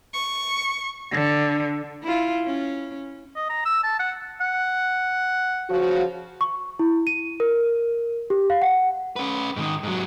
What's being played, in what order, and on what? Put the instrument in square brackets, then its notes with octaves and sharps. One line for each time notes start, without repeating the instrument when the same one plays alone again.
[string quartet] C#6
D3
[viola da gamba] E4 F4
C#4
[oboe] D#5
A#5
E6
A5
F#5
[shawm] F#5
[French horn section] C#3 F3 F#4
[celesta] C#6
E4
D#7
A#4
G4
F5
F#5
[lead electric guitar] C#4 B4
G#2 D#3
G#2 F#3